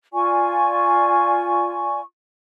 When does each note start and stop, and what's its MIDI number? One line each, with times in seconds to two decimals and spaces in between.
0.13 2.01 65
0.13 2.01 74
0.13 2.01 80
0.13 2.01 85